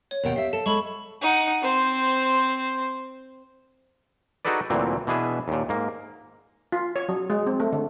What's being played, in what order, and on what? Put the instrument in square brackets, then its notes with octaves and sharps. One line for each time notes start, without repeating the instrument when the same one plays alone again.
[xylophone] C#5
[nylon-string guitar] D#2 B2 G5
[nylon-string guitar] G4 E5 [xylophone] F5
[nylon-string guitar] A4 [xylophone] A5
[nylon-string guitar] G#3 [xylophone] A4 B5 C#6
[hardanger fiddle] D#4 F#5
C4 C5
[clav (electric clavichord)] D#4 F#4 G#4 A4 B4 D5
D2 A#2 D3 E3 F#3 C4
B2 E3 D4 G#4 B4 E5
D#2 A#2
G#2 A#3
[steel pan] F4
C#5
F#3
G#3
C4
A3
D3